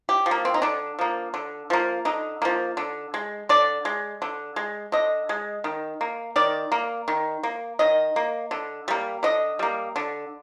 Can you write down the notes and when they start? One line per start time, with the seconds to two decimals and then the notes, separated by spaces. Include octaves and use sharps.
0.09 G4
0.26 F3
0.31 A#3
0.45 C4
0.54 D#4
0.62 D3 D4
0.99 F3 A#3
1.34 D3
1.70 F3 A#3
2.05 D3 D#4
2.42 F3 A#3
2.77 D3
3.14 G#3
3.49 D3 D5
3.85 G#3
4.22 D3
4.56 G#3
4.92 D3 D#5
5.29 G#3
5.64 D#3
6.01 A#3
6.36 D#3 D5
6.72 A#3
7.08 D#3
7.43 A#3
7.79 D#3 D#5
8.16 A#3
8.51 D3
8.88 G3 A#3
9.23 D3 D#5
9.59 G3 A#3
9.96 D3